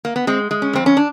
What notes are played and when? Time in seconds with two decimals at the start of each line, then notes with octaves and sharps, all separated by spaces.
0.05 A#3
0.16 B3
0.27 G#3 C4
0.51 G#3
0.62 C#4
0.73 F2 C4
0.86 C#4
0.97 D4